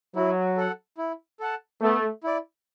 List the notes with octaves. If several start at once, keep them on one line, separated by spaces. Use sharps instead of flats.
F#3 E4
A4 F#5
E4
A4 F#5 A5
A3 B3
E4 D5